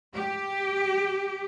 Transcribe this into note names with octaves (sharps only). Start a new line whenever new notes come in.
G4